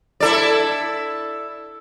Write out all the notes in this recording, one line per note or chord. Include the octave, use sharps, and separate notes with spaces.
E4 A4 D5